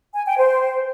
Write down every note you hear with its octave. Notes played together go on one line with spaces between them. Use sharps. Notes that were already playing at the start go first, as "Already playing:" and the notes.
G#5
G5
C5